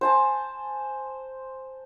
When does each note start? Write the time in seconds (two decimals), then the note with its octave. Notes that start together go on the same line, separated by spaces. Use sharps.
0.01 C5 G#5 A5